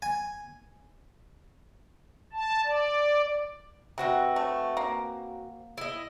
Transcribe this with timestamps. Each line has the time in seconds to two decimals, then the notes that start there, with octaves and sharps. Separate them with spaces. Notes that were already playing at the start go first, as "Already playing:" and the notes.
0.02 G#5
2.33 A5
2.64 D5
3.98 C3 C4 F#4 B4
4.36 A3
4.77 A#3
5.78 E4 D#5